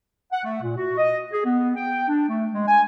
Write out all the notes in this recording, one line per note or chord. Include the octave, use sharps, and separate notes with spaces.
F#5
A3
A#2
F#4
D#5
G#4
B3
G5
D4
A3
G#3
G#5